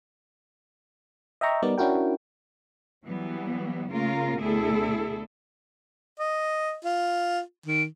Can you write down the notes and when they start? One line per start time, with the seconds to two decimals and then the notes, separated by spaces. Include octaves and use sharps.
1.41 D#5 E5 G5 A#5 C#6
1.63 G3 B3 D#4 A#4 D5
1.78 C#4 D4 E4 F#4 A#4 G5
3.05 E3 F#3 G3 B3
3.90 C#3 A3 A#3 F4 A#4
4.38 D2 B2 E4 G#4 A4
6.20 D#5
6.84 F4
7.66 D#3